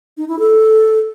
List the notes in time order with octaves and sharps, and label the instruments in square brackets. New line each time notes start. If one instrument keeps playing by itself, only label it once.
[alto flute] D#4
E4
A4